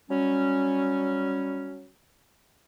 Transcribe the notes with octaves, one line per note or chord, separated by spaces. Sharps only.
F#3 G3 C#4